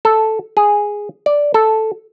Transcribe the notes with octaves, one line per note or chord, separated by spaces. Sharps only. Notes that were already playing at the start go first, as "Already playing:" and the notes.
A4
G#4
D5
A4